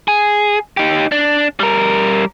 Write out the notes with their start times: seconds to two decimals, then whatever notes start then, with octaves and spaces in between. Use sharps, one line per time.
0.08 G#4
0.77 D#4 G4
1.12 D4
1.60 G3 A#4